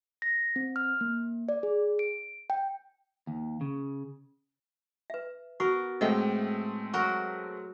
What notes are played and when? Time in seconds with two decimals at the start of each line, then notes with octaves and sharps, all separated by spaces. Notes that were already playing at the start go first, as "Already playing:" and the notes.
0.22 A#6
0.56 C4
0.76 F6
1.01 A#3
1.49 D5
1.63 G#4
1.99 D7
2.50 G5
3.27 D#2
3.61 C#3
5.10 B4 E5
5.60 B3 F#4 A#4 C#6
6.01 A2 G#3 A3 C4 D#5 E5 F#5 G5
6.93 F#3 F#4 A#4 C#6